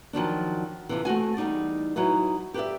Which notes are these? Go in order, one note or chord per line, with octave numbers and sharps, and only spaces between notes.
D#3 F3 F#3 D4
F2 C3 E3
A3 C4 F#4 G#5
E2 G3 D#4 D5
F#3 D#4 E4 B4
G4 B4 C5 D5 E5